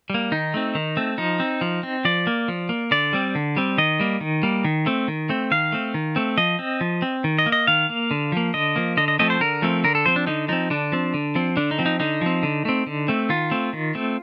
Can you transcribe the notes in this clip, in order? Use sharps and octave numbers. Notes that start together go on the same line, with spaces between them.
G3 A#3
D#3 D#4
A3 C4
D#3
A3 C4
F3 D#4
C4
F3
C4
F3 D5
A#3
F3
A#3
D3 D5
G3 C4
D3
G3 C4
D#3 D#5
G3 A#3
D#3
G3 A#3
D#3
A3 C4
D#3
A3 C4
D#3 F5
A3 C4
D#3
A3 C4
F3 D#5
C4
F3
C4
D#3
D#5
A#3
D#5
D#3 F5
A#3
D3
F3 A#3
D3 D#5
F3 A#3
D3 D#5
D#5
F3 A3 C4 D#5
C5
D3 A#4
F3 A3 C4
D3 A#4
A4
F3 C4 C5
D4
D3 D#4
F3 C4 D#4
D3 D4
F3 C4
D3
F3 C4
D3 D4
D#4
F3 C4
D#4
D3 D#4
F3 C4
D3
A3 C4
D3
A3 C4
D#3 F4
A3 C4
D#3
A3 C4